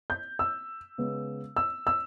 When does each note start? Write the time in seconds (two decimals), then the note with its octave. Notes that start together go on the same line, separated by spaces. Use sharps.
0.10 G6
0.39 E6
0.98 C#3 G#3 B3
1.57 E6
1.87 E6